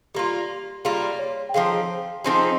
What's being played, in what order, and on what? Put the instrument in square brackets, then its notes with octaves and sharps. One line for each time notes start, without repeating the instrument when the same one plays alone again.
[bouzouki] G3 A#3 F4 [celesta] G4
[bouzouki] G3 A#3 F4 [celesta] G#4
[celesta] C#5
G5
[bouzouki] F3 C4 D#4 G#4 [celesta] F5
[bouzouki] F3 C4 D#4 G#4